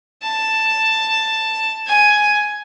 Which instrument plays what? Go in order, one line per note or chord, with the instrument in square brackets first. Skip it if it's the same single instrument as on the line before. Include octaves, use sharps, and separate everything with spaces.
[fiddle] A5
G#5